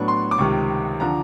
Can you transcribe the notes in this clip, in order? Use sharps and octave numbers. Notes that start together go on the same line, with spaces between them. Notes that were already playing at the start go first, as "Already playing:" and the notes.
Already playing: A2 F#3 B3 D4 C#6
C6
D6
C#2 C3 D#3 C#6
D3 F3 A#5